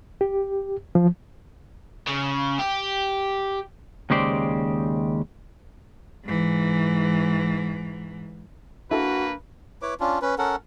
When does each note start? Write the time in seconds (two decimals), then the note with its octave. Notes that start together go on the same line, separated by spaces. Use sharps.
0.21 G4
0.95 F3
2.07 C#3
2.59 G4
4.10 D#2 C#3 G#3 G4 C5 D5
6.25 G#2 E3
8.91 A#3 D4 E4 F#4 A4 B4
9.82 E4 B4 C#5 D6
10.00 C#4 D4 F4
10.22 C#4 B4
10.38 C#4 A4 A#4 F#5